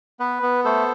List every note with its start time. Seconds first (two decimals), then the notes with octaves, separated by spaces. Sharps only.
0.20 B3 B4
0.43 B3
0.65 A3 A4 C5